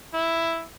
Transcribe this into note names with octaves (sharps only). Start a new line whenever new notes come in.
E4